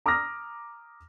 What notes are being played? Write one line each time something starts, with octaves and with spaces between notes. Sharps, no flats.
A#5 D6 D#6 F6 A#6